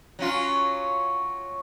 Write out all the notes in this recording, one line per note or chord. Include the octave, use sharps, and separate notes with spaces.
F#3 C#4 F4